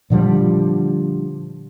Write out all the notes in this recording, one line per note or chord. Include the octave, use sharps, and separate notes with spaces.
A#2 D3 F3 G3